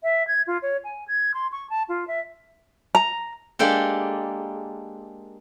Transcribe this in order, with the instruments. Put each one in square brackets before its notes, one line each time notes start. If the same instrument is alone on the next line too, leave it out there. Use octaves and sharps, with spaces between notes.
[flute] E5
G#6
F4
C#5
G#5
G#6
C6
C#6
A5
F4
E5
[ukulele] A#5
[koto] G#3 A#3 D4 G4 A4